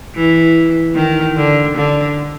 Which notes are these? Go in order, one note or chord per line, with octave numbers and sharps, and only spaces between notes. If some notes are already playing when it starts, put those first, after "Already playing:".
E3
D#3
D3
D3